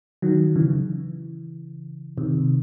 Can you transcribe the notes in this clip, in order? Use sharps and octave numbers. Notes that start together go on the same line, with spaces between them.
D#3 F#3
C#3 E3
C3 D#3